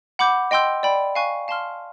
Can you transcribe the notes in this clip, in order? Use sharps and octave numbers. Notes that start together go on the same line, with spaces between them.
F#5 B5 D6 G6
D#5 G5 C6 E6 G6
D5 G5 B5
F5 G#5 C#6 F#6
F5 A5 C6 F6